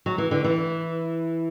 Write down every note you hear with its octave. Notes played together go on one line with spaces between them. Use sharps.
F#3
E3
D3
E3